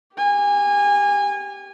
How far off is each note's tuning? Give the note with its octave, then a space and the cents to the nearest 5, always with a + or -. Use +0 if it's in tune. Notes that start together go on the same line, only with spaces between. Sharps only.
G4 +0 G#5 -25